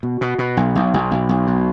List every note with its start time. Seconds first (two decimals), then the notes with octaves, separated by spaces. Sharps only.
0.03 B2
0.21 B2
0.38 B2
0.57 B1
0.75 B1
0.94 B1
1.11 B1
1.29 B1
1.47 B2